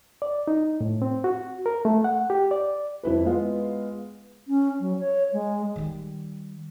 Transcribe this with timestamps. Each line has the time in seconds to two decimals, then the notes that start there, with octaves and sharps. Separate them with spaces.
0.22 D5
0.48 D#4
0.81 A2
1.02 C4
1.24 F#4
1.66 A#4
1.85 A3
2.04 F#5
2.30 G4
2.51 D5
3.03 F2 E4 B4
3.25 G#3 B3 F4
4.48 C#4
4.80 F#3
4.99 C#5
5.33 G#3
5.76 D#3 G3